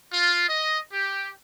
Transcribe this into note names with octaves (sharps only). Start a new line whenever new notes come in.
F4
D#5
G4